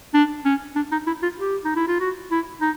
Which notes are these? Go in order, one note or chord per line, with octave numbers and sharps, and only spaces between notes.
D4
C#4
D4
D#4
E4
F4
G4
D#4
E4
F4
F#4
E4
D#4